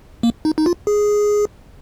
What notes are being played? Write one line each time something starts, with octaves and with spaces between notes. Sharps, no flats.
A#3
D#4
D#4
F4
G#4